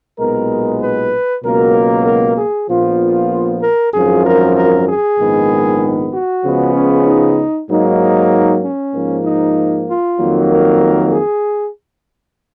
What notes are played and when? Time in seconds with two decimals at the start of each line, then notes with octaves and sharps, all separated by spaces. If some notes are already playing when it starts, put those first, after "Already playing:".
0.18 B1 A#2 G#3 B3 A#4
0.81 B4
1.43 C#2 B2 F#3 A#3 A#4
2.05 A#4
2.37 G#4
2.69 A#1 A#2 F3 B3 F4
3.62 A#4
3.94 G#1 F#2 F3 G#4
4.24 A#4
4.56 A#4
4.88 G#4
5.19 A#1 G#2 D#3 G#3 B3
6.13 F#4
6.44 C#2 C#3 F3 G#3 B3
6.75 C#4
7.06 D#4
7.69 G#2 F#3 A#3 D#4
8.00 D#4
8.63 C#4
8.94 G#2 F3 A#3
9.25 D#4
9.88 F4
10.19 F2 D#3 F#3 A#3
10.51 A#4
11.12 G#4